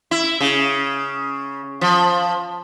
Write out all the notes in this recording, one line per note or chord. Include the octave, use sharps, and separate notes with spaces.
E4
C#3
F3